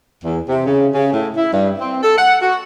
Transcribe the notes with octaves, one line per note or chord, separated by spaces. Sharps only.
E2
C3
C#3
C#3
A2
E4
G2
C4
A4
F#5
F#4